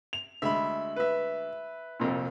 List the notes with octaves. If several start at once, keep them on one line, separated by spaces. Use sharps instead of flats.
F7
D2 G#3 E5 B5
B4 E5
C2 F2 A#2